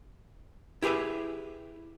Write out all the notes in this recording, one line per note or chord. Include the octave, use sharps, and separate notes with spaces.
E4 G4 G#4 B4 E5